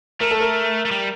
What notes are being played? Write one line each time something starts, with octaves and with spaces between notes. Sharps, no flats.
A3 A#4
A4
A#4
A3
G3